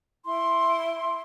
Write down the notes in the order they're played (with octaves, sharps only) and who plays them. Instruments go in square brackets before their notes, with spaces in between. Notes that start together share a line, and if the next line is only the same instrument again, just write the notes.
[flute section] E4 C6